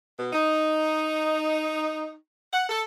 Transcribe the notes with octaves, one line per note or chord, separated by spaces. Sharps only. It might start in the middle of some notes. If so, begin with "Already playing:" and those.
B2
D#4
F#5
A4